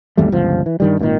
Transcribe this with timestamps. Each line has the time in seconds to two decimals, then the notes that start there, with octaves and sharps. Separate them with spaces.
0.17 G#1 E2 G3 A3
0.32 G1 C#2 F3
0.66 E3
0.80 G2 D#3 G3
0.99 G#1 G2 A#2 D#3